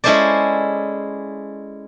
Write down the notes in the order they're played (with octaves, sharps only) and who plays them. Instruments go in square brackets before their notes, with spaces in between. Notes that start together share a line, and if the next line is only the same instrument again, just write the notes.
[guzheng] G#3 C#4 E4 A4 C5 D5